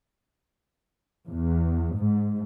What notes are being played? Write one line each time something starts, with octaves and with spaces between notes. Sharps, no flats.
E2
G#2